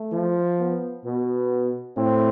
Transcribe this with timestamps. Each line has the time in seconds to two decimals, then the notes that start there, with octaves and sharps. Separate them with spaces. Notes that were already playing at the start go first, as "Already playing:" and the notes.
Already playing: A3
0.12 F3
0.59 B3
1.05 B2 B3
1.97 A2 C4